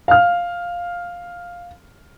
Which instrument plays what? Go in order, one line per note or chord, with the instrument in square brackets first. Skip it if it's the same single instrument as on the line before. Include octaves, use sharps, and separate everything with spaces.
[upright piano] F5 F6